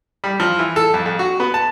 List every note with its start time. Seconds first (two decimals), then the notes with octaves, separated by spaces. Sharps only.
0.24 G3
0.40 F3
0.59 E3
0.76 A4
0.94 F2
1.06 F2
1.19 F#4
1.40 B3
1.54 A5